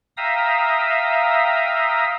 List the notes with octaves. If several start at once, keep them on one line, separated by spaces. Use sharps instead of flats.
E5 F5 G5 A#5 D#6 E6